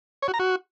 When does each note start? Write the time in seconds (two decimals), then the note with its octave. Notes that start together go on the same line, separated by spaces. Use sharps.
0.22 C#5
0.28 F#4
0.34 A#5
0.39 F#4